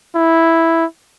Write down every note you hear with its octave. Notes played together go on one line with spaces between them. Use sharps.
E4